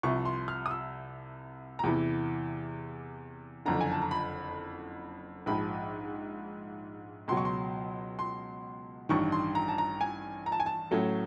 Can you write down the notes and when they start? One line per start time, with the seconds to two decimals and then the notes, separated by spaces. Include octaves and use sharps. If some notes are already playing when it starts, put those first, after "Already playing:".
0.03 C2 C3 F3 C#6
0.25 C6
0.48 F6
0.66 D#6
0.71 E6
1.79 A#5
1.84 E2 C3 E3 B5
3.65 F#1 F2 D3 A#5
3.81 G#5
3.92 A5
4.02 A#5
4.11 B5
5.46 A#1 G#2 F3 B5
7.28 C#2 B2 F#3 C6
7.37 C#6
7.45 C6
8.19 C6
9.09 A1 G2 D#3 C#6
9.32 C6
9.55 A#5
9.68 A5
9.78 A#5
10.01 G#5
10.46 A#5
10.52 A5
10.60 G#5
10.66 A5
10.91 A2 F#3 A3 C#4